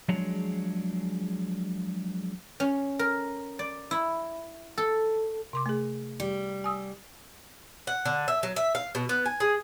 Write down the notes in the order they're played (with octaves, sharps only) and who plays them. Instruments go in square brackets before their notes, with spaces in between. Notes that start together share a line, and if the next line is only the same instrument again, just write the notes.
[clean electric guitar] F3 F#3 G#3 D4 G#4 C#5
[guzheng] C#4
A#4
D5
E4
A4
[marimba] C3 C6 D6
A3 G#4
[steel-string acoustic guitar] G3
[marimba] G#5 D#6 E6
[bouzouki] F#5
D3
E5
F#3
E5
F5
B2
B3
G#5
G#4